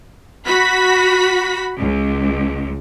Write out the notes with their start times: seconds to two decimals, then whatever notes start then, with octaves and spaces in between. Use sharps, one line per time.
0.46 F#4 B5 B6
1.79 C#2